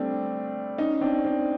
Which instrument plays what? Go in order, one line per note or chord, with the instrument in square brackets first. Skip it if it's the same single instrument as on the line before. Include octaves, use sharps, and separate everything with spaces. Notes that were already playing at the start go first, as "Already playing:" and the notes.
Already playing: [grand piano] G3 A3 C4 D4
C#4 D#4
C4 D4
C4 D4